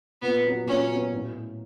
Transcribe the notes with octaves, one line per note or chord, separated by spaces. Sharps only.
A#2 B3
F#3 B3
A#2 C#4
F#3 B3
A2